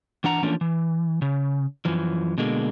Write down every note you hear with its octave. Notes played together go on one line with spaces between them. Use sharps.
E3 D4 F#5 A#5
E3 F3 A3 A#3 C#4 D4
E3
C#3
F#2 E3 F3
B2 D3 G#3 A#3